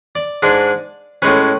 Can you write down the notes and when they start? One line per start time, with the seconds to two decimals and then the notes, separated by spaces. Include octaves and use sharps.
0.15 D5
0.43 G#2 G#3 D4
1.22 A2 G#3 C#4 B4